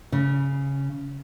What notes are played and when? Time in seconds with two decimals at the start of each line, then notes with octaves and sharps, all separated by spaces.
0.12 C#3